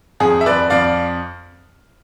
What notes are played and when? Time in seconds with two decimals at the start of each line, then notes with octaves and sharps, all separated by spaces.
0.20 F2 G#4
0.41 E5
0.46 F2 B4 D5
0.70 F2 D5 F5